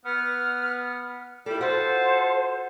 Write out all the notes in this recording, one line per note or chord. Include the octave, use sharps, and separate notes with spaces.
B3 F6
A#2 G3 E4 A4
F4 F#4 A4 C5 F#5